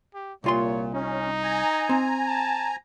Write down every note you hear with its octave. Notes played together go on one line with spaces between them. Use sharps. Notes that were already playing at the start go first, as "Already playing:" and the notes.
G4
C2 A#2 F4 C#5 C6
C#4 D#4
G#5 A#5
C4
A5